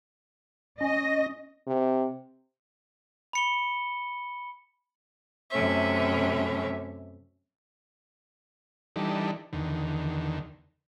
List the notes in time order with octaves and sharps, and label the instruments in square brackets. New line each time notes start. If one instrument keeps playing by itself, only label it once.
[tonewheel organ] C#4 [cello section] D#5
[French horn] C3
[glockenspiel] B5 C#7 G7
[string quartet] F#2 C3 A3 C#4 E5
[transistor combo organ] E3 G3 D4 D#4 A4
E2 D3 D#3